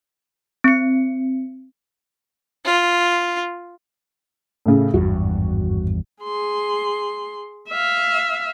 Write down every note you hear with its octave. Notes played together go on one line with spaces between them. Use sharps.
C4 C#7
F4
A2 C#3
G#1 E2 G2 F#4
G#4 C6
E5 F5